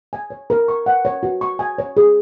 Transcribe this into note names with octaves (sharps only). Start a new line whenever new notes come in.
G#5
C#5
A#4
C#6
F#5
C#5
F#4
C#6
G#5
C#5
G#4